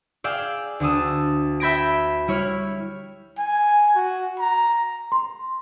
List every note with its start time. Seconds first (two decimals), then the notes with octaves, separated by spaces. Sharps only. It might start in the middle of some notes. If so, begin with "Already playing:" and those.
0.24 G#4 D5 F5 G5 D6 E6
0.80 D2 D4 A5 D#6 E6
1.60 E5 G5 B5 G#6 A#6 D7
2.28 G3 E4 C#5 F6
3.38 G#5
3.95 F#4
4.39 A#5
5.12 C6